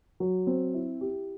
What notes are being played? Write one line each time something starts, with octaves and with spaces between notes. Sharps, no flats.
F#3
C4
E4
G4